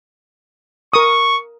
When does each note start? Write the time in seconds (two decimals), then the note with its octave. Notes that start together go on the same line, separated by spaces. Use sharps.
0.93 A#4 C#6 D#6